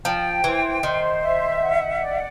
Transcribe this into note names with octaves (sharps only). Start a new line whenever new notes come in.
F3 G5
E3 C5
D#3 C5
E5
F#5
D5